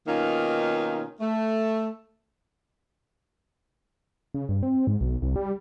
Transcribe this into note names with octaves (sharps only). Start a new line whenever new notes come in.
B2 D#3 A#3 C#4 D#4 F4
A3
C#3
G2
C4
G#2
B1
C2
G3